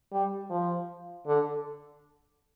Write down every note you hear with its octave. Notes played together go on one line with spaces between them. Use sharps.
G3
F3
D3